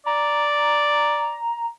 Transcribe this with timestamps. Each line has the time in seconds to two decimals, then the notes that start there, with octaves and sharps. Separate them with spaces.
0.06 D5 A#5